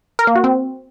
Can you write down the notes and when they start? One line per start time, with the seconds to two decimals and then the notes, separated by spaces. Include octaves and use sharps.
0.19 A#4
0.27 A#3
0.35 F#4
0.44 C4